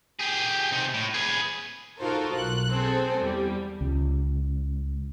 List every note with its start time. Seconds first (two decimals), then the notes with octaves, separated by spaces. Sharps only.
0.19 G4 G#4
0.71 C3 D#4
0.94 A2
1.14 G#4 B4
1.99 D#4 F4 F#4 A4 A#4 C5
2.35 B1 F#6
2.71 C4 G#4 A4 C5
3.20 E2 G3
3.81 C#2